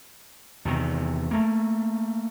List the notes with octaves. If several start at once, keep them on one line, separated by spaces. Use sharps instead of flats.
E2 C3 D#3
A3 A#3